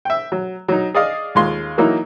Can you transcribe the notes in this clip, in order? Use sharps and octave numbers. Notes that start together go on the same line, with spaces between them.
E5 G5
F#3
F#3 D#4
G#4 D5 D#5 F5
D#2 G#3 F4 C6
E3 F#3 A#3 D#4 E4